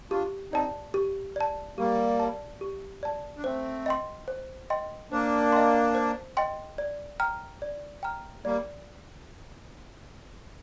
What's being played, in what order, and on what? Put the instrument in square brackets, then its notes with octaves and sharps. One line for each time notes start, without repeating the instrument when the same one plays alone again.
[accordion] D4 F4 [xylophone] G4
[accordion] C4 D#4 [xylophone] D5 A5
[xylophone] G4
D5 A5
[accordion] G3 A#3 [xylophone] G4
[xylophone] D5 A5
G4
D5 A5
[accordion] D4
[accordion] A3 C4 [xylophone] C5
[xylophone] D#5 G5 C6
C5
D#5 G5 C6
[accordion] A#3 D4 [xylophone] C5
[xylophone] D#5 G5 C6
C5
D#5 G5 C6
D5
G5 A#5 F6
D5
G5 A#5 F6
[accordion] G3 A#3 [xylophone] D5